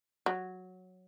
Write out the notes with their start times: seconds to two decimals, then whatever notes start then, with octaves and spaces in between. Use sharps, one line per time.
0.26 F#3